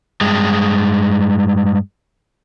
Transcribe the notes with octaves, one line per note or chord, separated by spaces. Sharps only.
G2 G#3